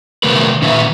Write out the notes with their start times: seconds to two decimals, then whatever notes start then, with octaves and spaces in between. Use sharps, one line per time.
0.23 C3 D#3 A3 A#4 B4
0.62 A#2 D#3 C#4 B4 E5